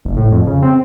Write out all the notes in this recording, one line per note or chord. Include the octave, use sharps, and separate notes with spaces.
F#1
A2
F2
C#3
C4